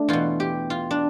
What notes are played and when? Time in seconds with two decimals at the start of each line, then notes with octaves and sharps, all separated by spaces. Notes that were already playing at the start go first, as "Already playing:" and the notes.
Already playing: A3 D4
0.09 E2 B2 F4
0.40 G4
0.70 F4
0.91 D4